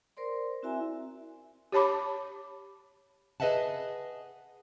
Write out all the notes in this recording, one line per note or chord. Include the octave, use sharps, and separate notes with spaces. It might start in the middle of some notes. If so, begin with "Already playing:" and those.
A#4 C5 D5 C6
C4 E4 F#4 E5 G#5 A#5
G4 C#5 A5 B5 D6
G#4 B4 D#5 E5 F#5 A5